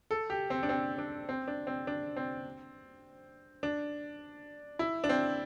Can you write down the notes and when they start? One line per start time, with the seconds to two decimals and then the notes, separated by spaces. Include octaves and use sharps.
0.11 A4
0.30 G4
0.50 C4
0.63 D4
0.69 C4
0.98 D4
1.29 C4
1.48 D4
1.67 C4
1.87 D4
2.16 C4
3.63 D4
4.79 E4
5.04 D4
5.09 C4